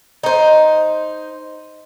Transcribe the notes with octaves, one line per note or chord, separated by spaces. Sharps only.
D#4 C5